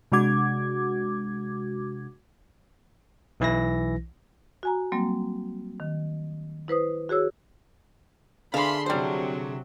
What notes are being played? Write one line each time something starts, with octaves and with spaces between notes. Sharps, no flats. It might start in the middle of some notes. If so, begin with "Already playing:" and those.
C3 G#3 D4 F#4 D6 G#6
B1 E3 E4 A#6
F#4 G#5 A#5
F#3 G3 A#3 C4
D#3
E4 B4 C5 D#6
F#4 G#4 C#5 E6
D3 E3 G#4 F5 A5 B5 C6
C3 F#3 G3 C5